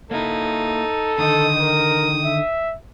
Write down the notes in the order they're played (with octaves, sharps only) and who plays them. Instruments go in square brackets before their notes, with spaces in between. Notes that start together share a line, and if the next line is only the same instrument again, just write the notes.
[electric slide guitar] A#3 E4 [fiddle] D#4 [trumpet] A4
[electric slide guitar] D3 D#3 D#4 [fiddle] D#6
[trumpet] A#4
E5